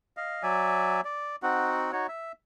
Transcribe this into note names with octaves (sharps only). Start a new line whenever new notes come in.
D#5 F5
F#3 D5 E5 G#5
D5
C4 D#4 F#4 F#5
D#4 F#4 C#5
E5